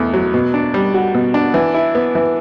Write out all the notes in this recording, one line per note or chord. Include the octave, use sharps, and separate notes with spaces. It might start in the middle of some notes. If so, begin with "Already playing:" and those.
Already playing: E2 B2 A3
F#3
B2
D4
G3
F#4
B2
D4
E3
E4
B3
E3